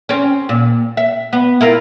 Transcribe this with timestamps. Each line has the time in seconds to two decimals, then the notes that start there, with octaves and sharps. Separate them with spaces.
0.09 C4 C#4
0.49 A#2
0.97 E5
1.33 B3
1.61 E4 F4 A#4